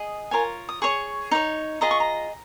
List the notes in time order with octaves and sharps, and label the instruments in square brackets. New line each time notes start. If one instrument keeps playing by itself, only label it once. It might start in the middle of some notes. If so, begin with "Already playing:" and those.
Already playing: [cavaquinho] G#4 D#5
F4 A#4 C#5 G#5
D#6
G#4 C#5 C#6
D#4 C#5
F4 G#4 D#5 A#5
C#6
A#5